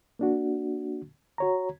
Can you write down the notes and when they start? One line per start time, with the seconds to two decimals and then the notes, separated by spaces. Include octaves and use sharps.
0.19 A#3 D4 F#4
1.38 F#4 C#5 A#5